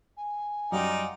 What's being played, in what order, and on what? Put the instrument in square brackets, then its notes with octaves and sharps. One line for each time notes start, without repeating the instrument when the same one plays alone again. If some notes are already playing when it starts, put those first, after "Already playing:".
[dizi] G#5
[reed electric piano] F#2 F#3 G3 [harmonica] D#4 F4 D5 [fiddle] F#5 G5